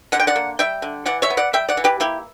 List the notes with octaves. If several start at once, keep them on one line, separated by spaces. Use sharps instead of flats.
D3 F#5
G5
D5 F#5
A#3
G3 E5 G5
D3
E3 D5 F#5
C#5 E5
B3
D5 F#5
G3 E5 G5
D5 F#5
E3
G4 B4
A#3 E4 G4